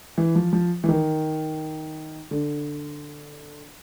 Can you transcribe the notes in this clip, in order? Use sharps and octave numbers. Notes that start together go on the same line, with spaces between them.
E3
F3
F3
E3
D#3
D3